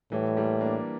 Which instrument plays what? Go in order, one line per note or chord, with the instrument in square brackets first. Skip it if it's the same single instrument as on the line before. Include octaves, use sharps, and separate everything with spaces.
[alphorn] A2 [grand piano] E3 G3
[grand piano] G3 A#3
A#3 D4